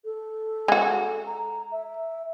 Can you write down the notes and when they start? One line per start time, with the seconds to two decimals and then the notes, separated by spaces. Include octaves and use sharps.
0.05 A4
0.68 G#3 F#4
1.26 A#5
1.71 E5